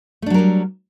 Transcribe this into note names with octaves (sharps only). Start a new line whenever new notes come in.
F#3 G3 A3 D4 A#4